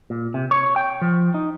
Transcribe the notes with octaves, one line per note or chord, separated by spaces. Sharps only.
A#2
C3
C#5
G5
F3
D#4